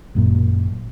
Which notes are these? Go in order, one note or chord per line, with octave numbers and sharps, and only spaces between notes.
G#1 F#2 A#2